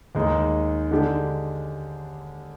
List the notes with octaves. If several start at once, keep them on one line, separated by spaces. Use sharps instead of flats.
D#2 D#3 G#3 D#4
D3 G#3 D4 G4